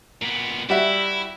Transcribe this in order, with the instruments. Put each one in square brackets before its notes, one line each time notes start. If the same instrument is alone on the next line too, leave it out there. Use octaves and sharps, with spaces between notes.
[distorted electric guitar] A#2 B3
[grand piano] G3 F#4 E5 [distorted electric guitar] E4